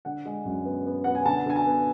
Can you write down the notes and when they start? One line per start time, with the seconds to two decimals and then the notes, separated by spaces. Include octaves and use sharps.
0.05 D3 F#5
0.25 G#3
0.45 F#2
0.65 B3
0.86 B3
1.04 B3 F#5
1.15 G#5
1.25 D3 A5
1.46 D3 G#5
1.56 A5
1.66 B3